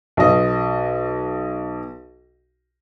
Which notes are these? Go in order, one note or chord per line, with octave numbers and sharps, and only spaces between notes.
B1 D#5